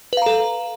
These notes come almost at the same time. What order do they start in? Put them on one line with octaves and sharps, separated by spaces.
B4 F5 A#5 A4